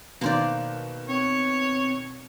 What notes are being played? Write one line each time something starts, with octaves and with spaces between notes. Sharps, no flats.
B2 D#3 A#3 C5 D5
C4 C#5